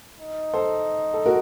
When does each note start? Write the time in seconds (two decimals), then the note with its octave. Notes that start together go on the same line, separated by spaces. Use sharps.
0.18 D#4
0.53 A4 C5
1.14 A4
1.26 F#4 A#4